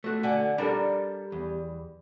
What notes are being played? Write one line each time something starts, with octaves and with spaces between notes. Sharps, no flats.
A3 F#4
D3 F#5 G#5
G3 D4 A4 A#4
E2